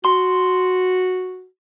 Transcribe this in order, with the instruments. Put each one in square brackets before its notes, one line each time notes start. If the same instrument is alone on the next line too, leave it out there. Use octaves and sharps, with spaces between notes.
[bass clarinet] F#4 [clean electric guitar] C6